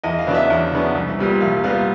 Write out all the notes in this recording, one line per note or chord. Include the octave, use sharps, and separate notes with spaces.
E2 D#5
F5
C#3 F#3 B3 D4
E5
E2
C#3 F#3 B3 D4
C2
A#2 G3 B3
C2 F5
A#2 G3 B3 F5